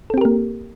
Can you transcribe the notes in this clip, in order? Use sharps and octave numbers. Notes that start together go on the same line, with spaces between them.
A#3 C4 G4 A4 A#4